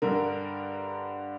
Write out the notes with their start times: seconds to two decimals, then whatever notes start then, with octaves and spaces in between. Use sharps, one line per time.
0.02 G2 D3 A#4